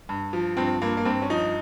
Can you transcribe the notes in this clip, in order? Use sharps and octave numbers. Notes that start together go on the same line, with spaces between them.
G2
F3
G2 C4
G2 A#3
A#3
G2 C4
C#4
F3 D#4